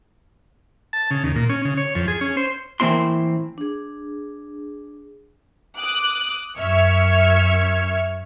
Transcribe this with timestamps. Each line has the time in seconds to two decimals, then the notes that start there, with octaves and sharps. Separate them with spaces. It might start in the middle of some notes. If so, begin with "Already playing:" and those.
0.93 A5
1.11 C#3
1.24 D#2
1.36 A#2
1.49 C#4
1.65 C#3
1.77 C#5
1.95 F2
2.08 G#4
2.21 C#4
2.37 C5
2.80 A2 E3 A#3 C4 E4 C6
3.58 D4 G#4
5.79 D6 D#6 F#6
6.58 F#2 E5 C#6 F6 G#6